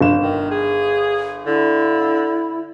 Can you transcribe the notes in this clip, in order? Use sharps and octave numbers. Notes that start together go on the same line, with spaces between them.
G1 E7
D#3
G#4
D3 E4